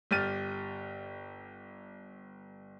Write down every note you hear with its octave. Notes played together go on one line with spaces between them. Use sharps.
G1 G4 F6 A6 D#7